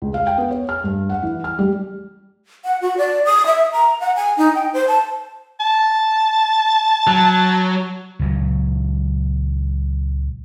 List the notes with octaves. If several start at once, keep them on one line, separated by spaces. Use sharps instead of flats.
C#2
F5
G5
B3
C#5
F6
G2
F#5
E3
F6
G3
F#5
F#4
D5
D#6
E5
A#5
F#5
G#5
D#4
G5
C5
A5
A5
F#3
C#2 A#2 F#3